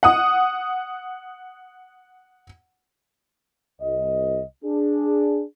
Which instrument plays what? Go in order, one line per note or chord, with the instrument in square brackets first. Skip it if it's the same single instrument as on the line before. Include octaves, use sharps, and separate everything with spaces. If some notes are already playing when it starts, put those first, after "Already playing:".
[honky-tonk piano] F#5 D#6
[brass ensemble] C2 D#5
D4 G#4